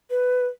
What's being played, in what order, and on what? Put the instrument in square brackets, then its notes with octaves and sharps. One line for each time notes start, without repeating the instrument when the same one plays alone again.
[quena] B4